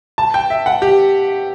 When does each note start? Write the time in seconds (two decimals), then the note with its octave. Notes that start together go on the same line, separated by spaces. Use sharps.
0.18 A5
0.34 G5
0.50 E5
0.66 F#5
0.82 G4